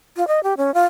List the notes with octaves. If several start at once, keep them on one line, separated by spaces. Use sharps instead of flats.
F4
D#5
G4
C#4
F4